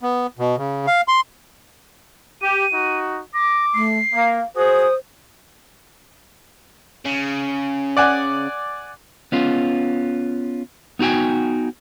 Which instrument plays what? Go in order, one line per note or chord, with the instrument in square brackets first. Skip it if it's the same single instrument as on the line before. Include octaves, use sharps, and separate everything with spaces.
[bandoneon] B3
B2
C#3
F5
C6
[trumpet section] G4 [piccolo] D#7
[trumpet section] D#4 F#4
[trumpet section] D6 [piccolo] A#6
[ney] A3 [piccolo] C7
[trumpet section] A#3 [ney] F5
[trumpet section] F#4 G#4 [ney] C5 [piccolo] D#6
[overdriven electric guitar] C#3
[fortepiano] D5 F#5 G#5
[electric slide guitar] B3 C#4 F4
B3 D#4 F#4 G5 G#5